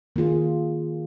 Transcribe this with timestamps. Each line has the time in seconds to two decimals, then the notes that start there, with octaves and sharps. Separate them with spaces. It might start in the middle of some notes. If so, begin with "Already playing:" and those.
0.16 D#3 A#3 F4 G#4